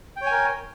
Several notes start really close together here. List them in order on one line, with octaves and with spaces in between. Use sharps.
G5 C#5 G#5 A#4